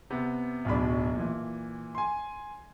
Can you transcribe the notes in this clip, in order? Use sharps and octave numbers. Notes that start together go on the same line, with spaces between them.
C3 B3
D1 B1 B2 D4 B5
A#2 E3
G#5 C6